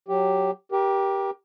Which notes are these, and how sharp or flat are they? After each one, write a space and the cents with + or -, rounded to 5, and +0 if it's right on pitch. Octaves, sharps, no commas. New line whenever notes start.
F#3 +0 G4 +0
G4 +0 A#4 +30